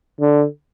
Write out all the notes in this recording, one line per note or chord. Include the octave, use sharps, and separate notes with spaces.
D3